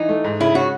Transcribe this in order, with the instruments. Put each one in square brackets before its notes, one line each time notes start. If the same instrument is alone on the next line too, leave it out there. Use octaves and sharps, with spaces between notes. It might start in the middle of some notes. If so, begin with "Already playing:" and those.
Already playing: [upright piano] E3 [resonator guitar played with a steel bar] D#4
[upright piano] A3
G#2
[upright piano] C#3 [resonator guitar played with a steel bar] E4
[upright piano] C#4 [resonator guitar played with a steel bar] F#4